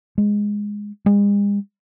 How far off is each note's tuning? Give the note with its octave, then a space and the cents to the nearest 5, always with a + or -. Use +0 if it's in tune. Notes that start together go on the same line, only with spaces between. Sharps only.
G#3 -5
G#3 -45